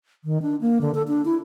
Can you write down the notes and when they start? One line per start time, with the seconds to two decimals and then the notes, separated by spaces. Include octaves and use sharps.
0.24 D#3
0.42 D4
0.61 A#3
0.81 D3
0.95 A4
1.08 D4
1.25 E4